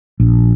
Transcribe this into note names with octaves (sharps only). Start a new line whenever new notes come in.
A#1